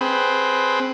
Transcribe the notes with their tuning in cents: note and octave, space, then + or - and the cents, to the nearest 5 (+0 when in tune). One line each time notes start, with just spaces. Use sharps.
C4 +0 G#4 +20 B4 +0